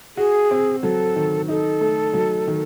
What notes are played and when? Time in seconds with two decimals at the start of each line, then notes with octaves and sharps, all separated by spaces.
0.17 F#4 G#4
0.51 C4
0.83 F#3 A4
1.16 D#3
1.48 D#4 A4
1.81 A3
2.13 F#3
2.47 D#3